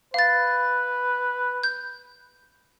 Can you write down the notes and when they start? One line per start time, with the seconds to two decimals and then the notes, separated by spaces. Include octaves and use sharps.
0.14 B4 F5 A6
1.63 G6